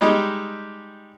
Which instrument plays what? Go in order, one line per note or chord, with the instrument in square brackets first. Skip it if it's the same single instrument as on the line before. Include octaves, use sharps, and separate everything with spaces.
[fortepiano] G3 G#3 D#4 G4